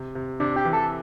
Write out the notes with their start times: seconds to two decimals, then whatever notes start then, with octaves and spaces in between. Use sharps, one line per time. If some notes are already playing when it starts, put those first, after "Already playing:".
Already playing: C3
0.15 C3
0.40 C3 D4
0.56 G4
0.65 E3
0.73 A4